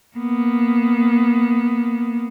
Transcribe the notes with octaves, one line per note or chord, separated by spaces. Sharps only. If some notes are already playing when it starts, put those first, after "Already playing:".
A#3 B3